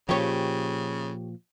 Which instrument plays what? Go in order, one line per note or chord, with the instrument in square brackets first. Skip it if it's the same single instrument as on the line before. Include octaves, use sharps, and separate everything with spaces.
[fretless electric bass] A#2 F3 [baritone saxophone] C#3 [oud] G4 C#5